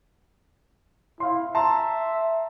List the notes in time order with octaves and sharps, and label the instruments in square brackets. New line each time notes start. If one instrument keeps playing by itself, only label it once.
[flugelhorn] E4 [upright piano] F5 C6
[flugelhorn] E5 [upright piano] A5 A#5 C6